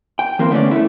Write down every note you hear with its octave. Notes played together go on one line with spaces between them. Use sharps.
G5
E3 F3 A#3 C4
D3 A3 B3 C#4 D5
A3 E4